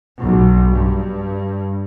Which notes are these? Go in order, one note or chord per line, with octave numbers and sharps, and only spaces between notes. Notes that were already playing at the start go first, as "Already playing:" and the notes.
B1
G2